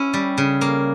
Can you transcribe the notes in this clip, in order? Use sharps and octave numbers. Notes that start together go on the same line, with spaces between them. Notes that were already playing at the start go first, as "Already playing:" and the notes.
Already playing: C#4 E4
G3
C#3
A#3